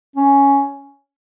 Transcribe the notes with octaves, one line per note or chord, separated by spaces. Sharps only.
C#4